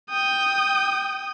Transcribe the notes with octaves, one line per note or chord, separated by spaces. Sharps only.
G5 D#6